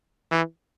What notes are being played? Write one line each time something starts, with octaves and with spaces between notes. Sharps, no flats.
E3